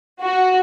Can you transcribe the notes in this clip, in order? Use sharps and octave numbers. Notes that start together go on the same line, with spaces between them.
F#4